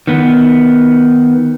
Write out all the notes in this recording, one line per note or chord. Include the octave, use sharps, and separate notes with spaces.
D#3 B3